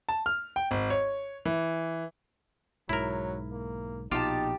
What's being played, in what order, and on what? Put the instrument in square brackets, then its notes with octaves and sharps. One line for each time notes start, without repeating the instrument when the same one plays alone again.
[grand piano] A5
F6
G5
G#1
C#5
E3
[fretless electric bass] B1 G#2 [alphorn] F#3 [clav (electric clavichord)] E4 A#4
[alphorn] A#3
[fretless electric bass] A#1 B2 [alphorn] D#4 [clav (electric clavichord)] F4 [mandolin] G4 A5